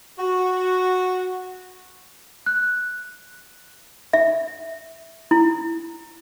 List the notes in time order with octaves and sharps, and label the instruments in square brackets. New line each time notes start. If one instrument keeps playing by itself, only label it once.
[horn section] F#4
[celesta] F#6
[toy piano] E5
E4